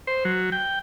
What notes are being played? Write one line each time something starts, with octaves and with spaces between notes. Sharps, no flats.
C5
F#3
G5